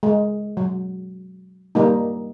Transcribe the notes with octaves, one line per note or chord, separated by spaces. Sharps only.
G#3
F#3
G3 A#3 D#4